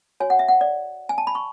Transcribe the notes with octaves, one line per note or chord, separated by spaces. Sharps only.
F#4 C#5 G#5
F#5
E5
F#5
D5
G#5
A5
B5
C#6